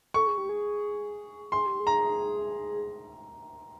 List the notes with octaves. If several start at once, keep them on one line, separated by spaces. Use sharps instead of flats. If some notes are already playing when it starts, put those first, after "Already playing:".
A4 C#6
G#4
G4
G#4
G#4 C6
G4
G#4
A#5